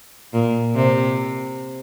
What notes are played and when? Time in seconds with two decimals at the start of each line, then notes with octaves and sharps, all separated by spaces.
0.34 A#2
0.76 C3